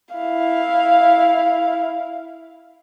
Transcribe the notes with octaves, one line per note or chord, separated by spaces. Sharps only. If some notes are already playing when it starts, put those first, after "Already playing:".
E4 F5